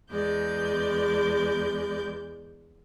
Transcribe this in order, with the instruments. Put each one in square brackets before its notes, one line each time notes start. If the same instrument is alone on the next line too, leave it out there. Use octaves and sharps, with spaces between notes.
[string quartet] E2 G#3 D5 G6